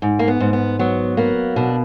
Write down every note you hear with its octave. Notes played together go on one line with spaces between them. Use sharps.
G#2
A#3
B3
G#2
B3
F#3 B3
A#3 B3
B2 D4